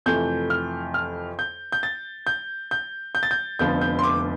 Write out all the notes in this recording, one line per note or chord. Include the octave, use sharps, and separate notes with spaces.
F2 C3 E3 A3 G6
F6
F6
G6
G6
A6
G6
G6
G6
A6
G6
F1 F2 D3 F3 B3 G6
G6
C6
D6